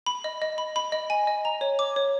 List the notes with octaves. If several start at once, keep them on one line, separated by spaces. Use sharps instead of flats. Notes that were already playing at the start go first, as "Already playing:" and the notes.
B5
D#5
D#5
B5
B5
D#5
G#5
D#5
A#5
C#5
D6
C#5